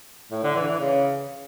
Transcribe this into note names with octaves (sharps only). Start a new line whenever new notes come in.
A2
D3
E3
E3
C#3